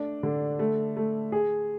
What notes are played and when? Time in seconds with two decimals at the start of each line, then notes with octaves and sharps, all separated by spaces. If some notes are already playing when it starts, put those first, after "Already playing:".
Already playing: A3 D4
0.23 D3
0.59 A3
0.97 A3
1.32 G#4